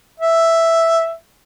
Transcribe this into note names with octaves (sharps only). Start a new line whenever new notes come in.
E5